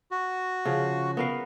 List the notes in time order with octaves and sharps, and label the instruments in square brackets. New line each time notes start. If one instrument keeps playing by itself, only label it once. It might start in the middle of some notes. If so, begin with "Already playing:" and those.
[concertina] F#4
[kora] C#3 F3
B3 A#4 F5